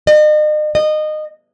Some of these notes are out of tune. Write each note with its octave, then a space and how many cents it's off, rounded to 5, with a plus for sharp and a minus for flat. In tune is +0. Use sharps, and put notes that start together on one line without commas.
D#5 -40
D#5 -20